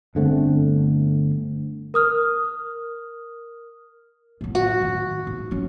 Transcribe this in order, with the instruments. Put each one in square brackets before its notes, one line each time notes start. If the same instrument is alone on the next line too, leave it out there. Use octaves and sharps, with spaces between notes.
[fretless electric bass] G1 D3 A3 C4
[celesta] A#4 D#6 F6
[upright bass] A2 F#3
[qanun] F#4
[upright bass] D#3
G#2
F#3 C#4